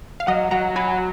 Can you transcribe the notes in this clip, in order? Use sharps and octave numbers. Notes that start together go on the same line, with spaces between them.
F5
F#3 D#5 F#5
F#3 F#5 A#5
F#4 G#5 B5